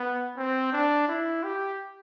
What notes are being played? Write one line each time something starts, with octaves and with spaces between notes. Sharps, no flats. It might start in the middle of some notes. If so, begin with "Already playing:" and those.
Already playing: B3
C4
D4
E4
G4